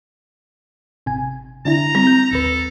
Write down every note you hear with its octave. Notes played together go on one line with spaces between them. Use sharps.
G#1 C3 G#5
D3 D4 E4 A#5
G3 C4
G6
A1 D#2 A4 B4